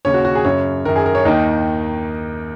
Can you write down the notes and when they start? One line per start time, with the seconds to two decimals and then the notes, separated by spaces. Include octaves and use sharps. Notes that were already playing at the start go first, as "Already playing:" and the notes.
0.05 D#2 C#3 C#5
0.14 F#4
0.25 F#4
0.35 G#4
0.44 F#2 C#3 C#5
0.85 F#2 D#3 A#4
0.96 G#4
1.06 A#4
1.15 C#5
1.25 D#2 D#3 D#4